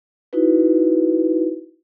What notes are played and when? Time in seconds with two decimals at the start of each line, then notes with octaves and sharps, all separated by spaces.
0.33 D#4 E4 F#4 B4